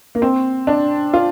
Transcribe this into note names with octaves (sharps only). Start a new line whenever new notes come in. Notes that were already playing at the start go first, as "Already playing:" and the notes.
A#3
C4
D4
F4